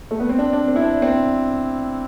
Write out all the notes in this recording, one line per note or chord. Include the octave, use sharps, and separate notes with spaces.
A3
B3
C4
D4
D4
C4
E4
D4
C4